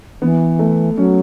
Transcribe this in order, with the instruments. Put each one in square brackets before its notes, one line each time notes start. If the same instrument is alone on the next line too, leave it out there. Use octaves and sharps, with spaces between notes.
[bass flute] E3 [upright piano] B3
[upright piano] A3
[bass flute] F#3 [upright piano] C#4